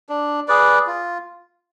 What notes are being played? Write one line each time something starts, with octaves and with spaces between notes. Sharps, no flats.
D4
G#4 B4 D5
F4